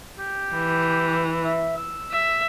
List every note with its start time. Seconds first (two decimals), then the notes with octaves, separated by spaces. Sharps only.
0.19 G4
0.54 E3
1.44 E5
1.77 E6
2.12 E5